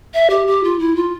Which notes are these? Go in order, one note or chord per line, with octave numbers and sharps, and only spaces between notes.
E5
G4
G4
F4
E4
F4